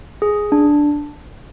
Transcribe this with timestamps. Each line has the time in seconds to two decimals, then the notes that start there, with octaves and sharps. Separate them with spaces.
0.22 G#4
0.52 D4